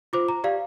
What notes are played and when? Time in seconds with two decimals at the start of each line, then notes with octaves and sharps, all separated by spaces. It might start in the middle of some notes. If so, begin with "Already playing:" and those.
0.13 F4 C5 D6
0.28 A#5
0.44 G4 D5 F5